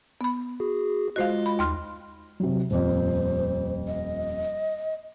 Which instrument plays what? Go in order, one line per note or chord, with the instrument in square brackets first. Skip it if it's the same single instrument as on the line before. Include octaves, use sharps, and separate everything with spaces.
[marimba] B3 B5
[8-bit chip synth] F#4 G#4
[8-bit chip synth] G#3 F4 D#5 [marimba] F#4 C5 F5
[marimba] B5
D#2 C6 F6
[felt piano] C3 F#3
[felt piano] D#1 F2 [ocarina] C5
[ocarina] D#5